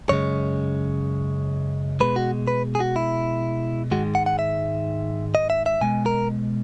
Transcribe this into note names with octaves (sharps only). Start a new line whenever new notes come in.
F#2 C#3 G#3 C#5
B2 G#3 B4
F#4
B4
G#4
F#4
E4
G#2 D#3 G#3 F#4
F#5
F#5
E5
D#5
E5
E5
B2 G#3 G#5
A#4